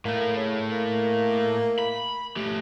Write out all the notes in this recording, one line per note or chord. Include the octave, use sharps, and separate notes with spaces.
A2 A3 A#3
C#3
A#3
B5
A3 G4